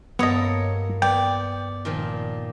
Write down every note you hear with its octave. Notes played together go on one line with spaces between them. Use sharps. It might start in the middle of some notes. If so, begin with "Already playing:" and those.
G2 A#3 B3 A4 C#5 D#5 D#6
B3 D5 G5
A#2 D#3 F3